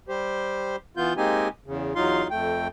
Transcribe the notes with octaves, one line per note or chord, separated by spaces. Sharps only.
G3 G4 C5
E3 B3 F4 G6
G#3 A#3 C4 D#4 G4 G#5
E2 C#3
E2 F#3 D#4 F4 F5 C6
F2 A3 G5